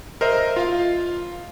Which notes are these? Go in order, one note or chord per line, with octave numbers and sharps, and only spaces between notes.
A#4 C5 D#5 E5
F4 F5